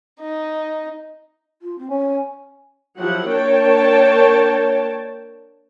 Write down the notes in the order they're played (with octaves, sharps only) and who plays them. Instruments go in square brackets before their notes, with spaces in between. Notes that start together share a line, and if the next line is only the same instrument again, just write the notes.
[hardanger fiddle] D#4
[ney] F4
C4
[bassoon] C#4 [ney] G#5
[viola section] F3 F#3 E4 G4 F#5
A#3 D4 A#4 C#5 G5 A5